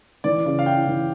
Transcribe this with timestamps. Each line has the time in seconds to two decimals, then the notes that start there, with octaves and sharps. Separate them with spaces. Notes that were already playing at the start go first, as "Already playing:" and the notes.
0.24 E3 D5
0.45 C#3
0.59 F5
0.66 E4 G5
0.87 E3